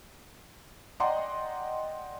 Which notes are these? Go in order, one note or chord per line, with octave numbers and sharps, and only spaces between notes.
D5 D#5 F#5 G5 A#5 C6